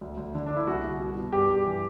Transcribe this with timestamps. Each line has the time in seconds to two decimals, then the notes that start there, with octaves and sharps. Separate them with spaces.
0.01 D2
0.17 D2
0.35 D3
0.46 D3 D4
0.56 E4
0.67 C2 F#4
0.84 C2
1.00 B2
1.17 B2
1.32 G2 G4
1.50 G2
1.65 E3